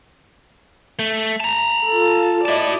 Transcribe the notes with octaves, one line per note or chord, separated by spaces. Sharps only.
A3
A5 A#5
F4 A4
E4 F#4 D5 D#5 A5